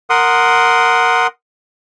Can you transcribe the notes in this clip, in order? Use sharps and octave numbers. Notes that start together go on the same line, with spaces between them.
A#4 F#5 C6 D#6